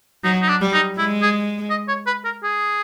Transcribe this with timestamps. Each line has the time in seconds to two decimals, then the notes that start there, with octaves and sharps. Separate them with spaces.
0.24 F#3 D#4
0.42 D#4
0.48 D4
0.61 G3
0.73 D#4
0.98 G#3 E4
1.22 G#4
1.70 D#5
1.88 C#5
2.06 B4
2.24 A#4
2.43 G#4